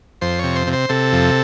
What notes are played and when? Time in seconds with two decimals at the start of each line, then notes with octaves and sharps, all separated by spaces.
0.21 F2 C5
0.39 C3 C#5
0.56 C5
0.67 C3
0.73 C5
0.89 C3 A4
1.13 F2